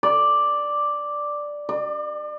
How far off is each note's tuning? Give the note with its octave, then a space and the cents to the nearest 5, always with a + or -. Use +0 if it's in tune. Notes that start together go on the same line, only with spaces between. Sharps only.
D5 +0
D5 +35